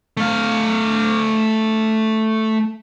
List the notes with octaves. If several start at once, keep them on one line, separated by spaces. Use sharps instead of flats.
A3 F5